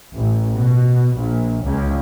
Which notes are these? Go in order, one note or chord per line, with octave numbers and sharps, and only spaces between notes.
A1
B2
A#1
C#2